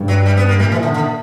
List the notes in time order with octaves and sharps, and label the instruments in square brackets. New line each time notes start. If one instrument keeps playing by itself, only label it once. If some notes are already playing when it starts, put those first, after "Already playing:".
Already playing: [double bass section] G2
[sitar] F#3
G3
B3
A#3
[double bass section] A#2 [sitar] G3
[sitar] E3
D3
D3